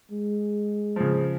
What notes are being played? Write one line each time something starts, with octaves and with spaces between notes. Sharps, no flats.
G#3
C#3 F3